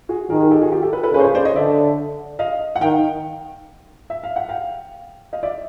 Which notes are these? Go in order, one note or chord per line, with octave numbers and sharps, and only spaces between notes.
F#4 G#4
D#3 G#4 A#4
G#4 A#4
G4 A4
F#4 G#4
F4 G4
G4 A4
A4 B4
A4 B4
C#3 A4 B4
C5
B4 C#5
C5 D5
C#5 D#5
D3 D5 E5
D#5 F5
F#5
D#3 F5 G5
E5
F5
F#5
F5 G5
D#5 F5
D5 E5